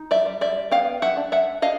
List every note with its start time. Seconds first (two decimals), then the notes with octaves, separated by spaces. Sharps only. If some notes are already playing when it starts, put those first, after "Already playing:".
Already playing: D#4
0.11 D5 E5
0.26 G3
0.41 D5 E5
0.71 B3 F5 G5
1.02 E5 F#5
1.17 D4
1.32 E5 F#5
1.62 D4 D#5 F5